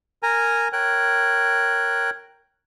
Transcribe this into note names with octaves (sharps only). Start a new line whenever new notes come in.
A#4 G#5 A#5
A#4 C#5 G5 F#6